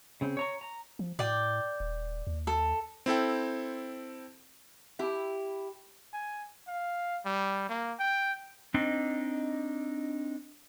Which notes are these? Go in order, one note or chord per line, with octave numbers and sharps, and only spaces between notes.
C#3 C4
C#5 A#5 C#6
A#5
F3
A2 D5 G5
D#1
D#2
A4
C4 E4 A4 G5
E4 G4
G#5
F5
G3
A#3
G5
C4 D4 D#4 D#5